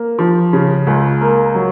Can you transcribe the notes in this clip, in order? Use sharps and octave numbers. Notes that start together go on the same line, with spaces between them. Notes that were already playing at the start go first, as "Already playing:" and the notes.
Already playing: A#3
F3
C#3
C#2
A#3
F#3